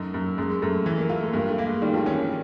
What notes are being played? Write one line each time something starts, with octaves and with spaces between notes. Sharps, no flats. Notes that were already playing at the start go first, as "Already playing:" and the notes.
Already playing: F#2 A3 D#4
F#2
F#2 G#3
F#2 A3
E3
A#3
A#3 F4
A3
G2 A#3
A3
A#3
G#3
D#3 G3
F3
E3 C#4
D#3